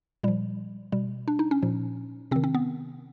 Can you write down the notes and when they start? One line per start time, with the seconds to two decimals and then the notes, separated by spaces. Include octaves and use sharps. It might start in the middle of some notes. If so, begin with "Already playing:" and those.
0.23 A#2 F3 G3
0.92 B2 G3
1.28 D4
1.39 D#4
1.51 C#4
1.62 A#2 F3
2.31 C3 C4
2.36 D#3
2.44 C4
2.54 B3